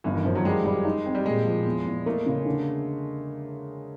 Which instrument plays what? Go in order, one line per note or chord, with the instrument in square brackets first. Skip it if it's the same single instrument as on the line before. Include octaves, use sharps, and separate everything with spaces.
[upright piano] G1 [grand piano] E3
[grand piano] D#3
[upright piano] F#2 [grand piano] F3
[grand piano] F#3
[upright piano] G3 [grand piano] G#3
[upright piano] G3
D#4
C4
[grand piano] G3
[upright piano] A#2 [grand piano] G#3
[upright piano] F3
E2
E2
[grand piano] A3 [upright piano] A#3
[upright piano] C#3
D3